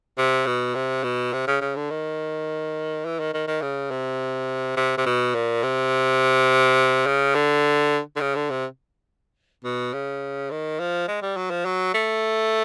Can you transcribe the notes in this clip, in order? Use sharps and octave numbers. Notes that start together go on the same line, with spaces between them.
C3
B2
C3
B2
C3
C#3
C#3
D3
D#3
E3
D#3
D#3
D#3
C#3
C3
C3
C3
B2
A#2
C3
C#3
D3
D3
C#3
D3
C3
B2
C#3
D#3
F3
G#3
G3
F#3
F3
F#3
A3